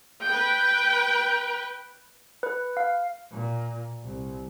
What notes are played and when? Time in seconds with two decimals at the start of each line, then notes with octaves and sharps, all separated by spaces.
0.25 B4 G5
2.43 B4
2.77 F5
3.31 A#2
4.03 C2